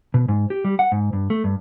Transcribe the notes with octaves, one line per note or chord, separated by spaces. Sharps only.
B2
G#2
G4
G3
F#5
G#2
G2
A3
G2